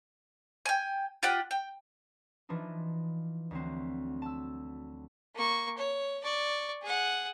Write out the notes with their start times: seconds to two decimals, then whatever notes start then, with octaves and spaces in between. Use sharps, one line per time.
0.66 G5 G#5
1.23 F4 G4 F#5
1.51 G5
2.49 E3 F3 D4 D#4
3.51 D2 F#3 C4
4.22 A5 E6
5.35 A#3 C#6
5.77 C#5
6.23 D5 C#6
6.82 G#4 F#5